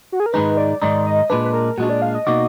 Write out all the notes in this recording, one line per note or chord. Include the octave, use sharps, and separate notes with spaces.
F#4
G#4
A#4
G#2 D#3 G#3 D#4 B4
D5
G#2 D#3 G#3 D#4 D5
D#5
A#2 G#3 D4 B4
B4
A#4
A#2 G#3 D4 F#4
D5
F5
D#5
B2 A#3 D#4 F#4 D5